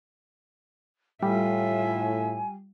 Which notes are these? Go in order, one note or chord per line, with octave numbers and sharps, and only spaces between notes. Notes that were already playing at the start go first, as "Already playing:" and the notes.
A2 G3 F4 E5 G#5